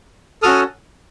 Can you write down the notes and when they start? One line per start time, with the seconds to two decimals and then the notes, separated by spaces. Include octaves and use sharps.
0.43 C#4 F#4 A4 D#6 F6